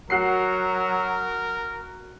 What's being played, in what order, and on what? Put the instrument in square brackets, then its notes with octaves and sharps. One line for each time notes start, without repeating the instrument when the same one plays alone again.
[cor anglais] F#3 [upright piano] F#4 C7 [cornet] A#4